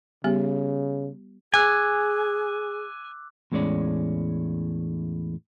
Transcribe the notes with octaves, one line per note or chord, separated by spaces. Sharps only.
C#3 G3 B3 G4
G#4 G#5 D6 E6 F#6
E2 A2 G#3 C#4 D5